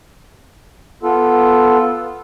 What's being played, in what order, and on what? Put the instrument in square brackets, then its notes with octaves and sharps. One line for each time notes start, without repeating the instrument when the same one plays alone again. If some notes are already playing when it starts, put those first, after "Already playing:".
[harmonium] B3 F4 A4